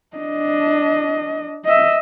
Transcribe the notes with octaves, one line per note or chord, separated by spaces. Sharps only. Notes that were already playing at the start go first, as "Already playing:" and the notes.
D4 D#5
D#5 E5